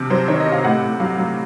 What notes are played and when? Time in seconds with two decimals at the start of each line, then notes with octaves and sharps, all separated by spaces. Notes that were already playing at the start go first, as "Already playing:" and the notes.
Already playing: C3 F3
0.10 F#3 C5
0.28 D#3 C#5
0.40 D#5
0.46 C3
0.52 F5
0.64 A2 F#5
0.82 A2
1.00 F#3 F5
1.18 F#3